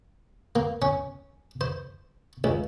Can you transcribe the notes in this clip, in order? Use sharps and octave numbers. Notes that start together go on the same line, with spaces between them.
A#3
C#4
C5
C#2